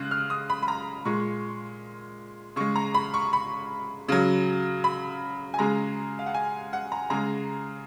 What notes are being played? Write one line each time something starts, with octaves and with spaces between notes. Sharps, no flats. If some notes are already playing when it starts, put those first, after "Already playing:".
Already playing: C#3 G#3 F#6
F6
D#6
B5
B5
A#5
A#2 G#3 C#6
C#3 G#3 C#6
A#5
B5
C#6
B5
C#3 F#3
B5
G#5
C#3 G#3 A#5
F5
F#5
G#5
F#5
A#5
C#3 G#3 A#5